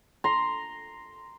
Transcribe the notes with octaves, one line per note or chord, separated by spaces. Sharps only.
A#5 C6